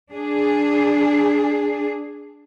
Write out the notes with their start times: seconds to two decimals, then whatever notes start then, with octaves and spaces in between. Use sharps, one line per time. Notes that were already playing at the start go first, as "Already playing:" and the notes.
0.13 D4 G#4